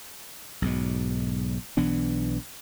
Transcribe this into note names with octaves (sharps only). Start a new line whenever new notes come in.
B1 G#2 B2
B1 E3 B3 D4